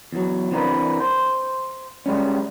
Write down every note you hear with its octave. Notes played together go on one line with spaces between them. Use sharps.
E2 F#3
E3 C4 D4 G4 A#4 B4
C5
G3 G#3 C#4